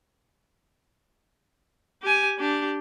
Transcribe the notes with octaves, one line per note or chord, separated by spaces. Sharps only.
G4 G#5
D4 G4